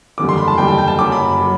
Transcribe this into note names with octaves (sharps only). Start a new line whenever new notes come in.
F#1 E2 D3 G3 D6
C6
B5
A5
F#1 E2 D3 G3 G5
G5
G5
A5
F#1 F#2 F#3 D6
B5
F#3